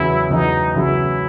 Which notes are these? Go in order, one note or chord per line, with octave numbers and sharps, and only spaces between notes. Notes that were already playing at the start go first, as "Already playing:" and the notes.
Already playing: E2 C#3 F#3 E4
E2 C#3 F#3 D#4
E2 C#3 F#3 E4